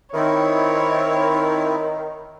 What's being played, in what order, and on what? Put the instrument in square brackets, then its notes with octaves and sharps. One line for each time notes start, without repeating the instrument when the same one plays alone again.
[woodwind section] D#3 [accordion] C4 E4 [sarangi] C#5